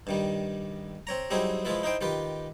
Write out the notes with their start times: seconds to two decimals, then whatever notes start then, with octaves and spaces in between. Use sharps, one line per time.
0.07 G2 D#3 G3
1.07 C4 C#5 A#5
1.30 F#3 G3 C4 D#4 E4 G#4
1.65 F3 G#3 E4 F4 B4
1.83 D#4 E4 C5 G5
2.01 D#3 F4 G4 B4